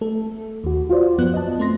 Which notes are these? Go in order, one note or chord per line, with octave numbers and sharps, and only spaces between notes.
A3 A4
D#2 F#4
F4 F#4 C5 D5
F#2 F3 B3 F#6
D#5 A5
A3 C4 C6 A#6